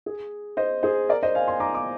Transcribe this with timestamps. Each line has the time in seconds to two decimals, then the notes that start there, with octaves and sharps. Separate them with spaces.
0.06 G#4
0.57 C5 D#5
0.83 G#4 C5
1.09 A#4 D5
1.23 C5 D#5
1.35 F5 G#5
1.47 G#5 C6
1.60 A#5 D6
1.75 D6